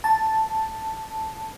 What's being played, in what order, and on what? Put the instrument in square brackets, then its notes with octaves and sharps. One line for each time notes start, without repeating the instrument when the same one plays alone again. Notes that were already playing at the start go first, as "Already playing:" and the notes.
[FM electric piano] A5